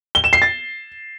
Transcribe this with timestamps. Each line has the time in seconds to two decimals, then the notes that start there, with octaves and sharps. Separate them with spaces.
0.15 G7
0.24 E7
0.33 C7
0.42 A6